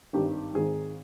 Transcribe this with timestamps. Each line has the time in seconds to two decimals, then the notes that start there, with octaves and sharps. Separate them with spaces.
0.13 G#1 G2 D#3 G4
0.54 G#1 G#2 D#3 G#4